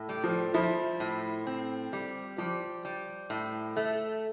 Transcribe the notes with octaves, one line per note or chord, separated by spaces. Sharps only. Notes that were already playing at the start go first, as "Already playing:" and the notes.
Already playing: A2
G3
F3
F3 E4
A2
C4
G3
F3 G3
G3
A2
A3